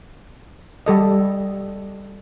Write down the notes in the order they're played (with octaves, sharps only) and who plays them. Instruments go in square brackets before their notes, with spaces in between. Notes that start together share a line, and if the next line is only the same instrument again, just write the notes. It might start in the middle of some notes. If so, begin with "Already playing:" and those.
[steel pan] G3 A4 D#5